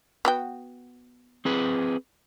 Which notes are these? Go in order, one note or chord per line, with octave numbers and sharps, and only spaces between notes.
B3 F#4 G5
C4 G#4 B4